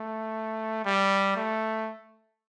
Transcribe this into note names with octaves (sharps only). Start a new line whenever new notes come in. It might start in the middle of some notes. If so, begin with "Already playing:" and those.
Already playing: A3
G3
A3